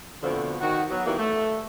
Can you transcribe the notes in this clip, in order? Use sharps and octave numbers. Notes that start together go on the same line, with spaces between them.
B2 D3 F3 A3 C4
D#3 F#4
F#3 B3
D#3 E3 G3 A#3 B3
A3